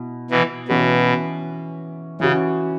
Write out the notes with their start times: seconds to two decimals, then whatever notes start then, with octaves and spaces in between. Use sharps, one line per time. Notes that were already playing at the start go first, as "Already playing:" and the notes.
Already playing: B2 E4
0.31 B2 E3
0.68 B2 E3 C#4 F#4 B4
2.20 C#3 E3 C#4 F#4